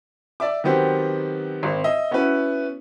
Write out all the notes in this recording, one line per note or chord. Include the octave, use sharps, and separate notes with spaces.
D5 E5 D6
D#3 F#3 B3 C4 G4
G#1 C4
D#5 E5
B3 C#4 E4 F#4 B4